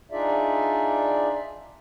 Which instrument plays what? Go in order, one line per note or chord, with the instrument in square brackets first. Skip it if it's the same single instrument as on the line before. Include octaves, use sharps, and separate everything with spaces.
[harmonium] D4 D#4 F4 G#4 D5 E5